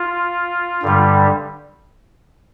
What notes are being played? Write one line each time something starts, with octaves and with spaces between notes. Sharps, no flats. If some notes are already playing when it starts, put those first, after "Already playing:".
Already playing: F4
G2 D3 G3